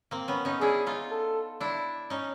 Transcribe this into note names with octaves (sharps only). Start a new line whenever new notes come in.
A#3 C4
B3 C#4
C#4 D#4
D4 E4 G#4
D#4 F4
A4
D4 E4
C#4 D#4